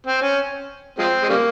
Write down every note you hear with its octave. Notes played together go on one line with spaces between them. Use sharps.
C4
C#4
F3 G#3 C4
G#3
C#3 G3 A#3